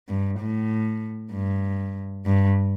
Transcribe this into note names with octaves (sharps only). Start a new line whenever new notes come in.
G2
A2
G2
G2